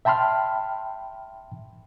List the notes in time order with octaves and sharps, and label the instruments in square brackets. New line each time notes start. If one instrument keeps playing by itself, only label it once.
[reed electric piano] E5 G5 A5 B5 C6 F6